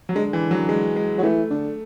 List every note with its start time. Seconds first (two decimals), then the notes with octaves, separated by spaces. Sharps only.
0.09 F#3
0.15 D3 G#3
0.33 E3
0.51 F#3
0.69 G#3
0.96 G#3
1.18 F#3
1.23 E3 A3
1.50 D3